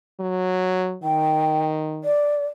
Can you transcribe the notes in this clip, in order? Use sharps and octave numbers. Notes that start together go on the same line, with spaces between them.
F#3
D#3 G5
D5